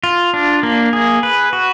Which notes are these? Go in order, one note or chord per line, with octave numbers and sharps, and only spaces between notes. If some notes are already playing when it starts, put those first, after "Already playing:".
F4
D4
A#3
G#4
B4
F#4